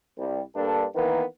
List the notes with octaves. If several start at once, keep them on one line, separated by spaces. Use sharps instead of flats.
C2 G3
G2 A#3 D4 A4
D#3 E3 A#3 B3